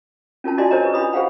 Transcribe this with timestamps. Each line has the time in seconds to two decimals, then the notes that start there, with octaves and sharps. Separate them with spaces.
0.44 C#4 F4 A#4 A5
0.58 F4 F#4 D5 D#5 G#5 C6
0.71 D4 A#4 C5 C#5 D#5 A#5
0.82 G#4 B4 D#5
0.94 D4 F4 B5 D#6
1.13 G#4 C5 F5 F#5 B5